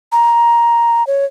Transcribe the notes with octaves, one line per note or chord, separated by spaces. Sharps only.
A#5
C#5